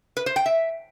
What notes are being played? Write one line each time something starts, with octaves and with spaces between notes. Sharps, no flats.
B4
C5
G5
E5